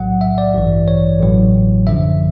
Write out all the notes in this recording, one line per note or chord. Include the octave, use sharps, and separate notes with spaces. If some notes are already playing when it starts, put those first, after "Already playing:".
Already playing: B1 A2 F#3 F#5
E5
D5
A1 G2 E3
C#5
A1 A2 F#3
F#2 D3 F3 E5